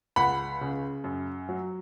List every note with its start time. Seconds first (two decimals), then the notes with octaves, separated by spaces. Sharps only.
0.16 C#2 F#5 B5
0.61 C#3
1.04 F#2
1.49 F#3